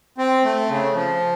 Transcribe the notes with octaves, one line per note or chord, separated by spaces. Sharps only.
C4
A3
C#3
F3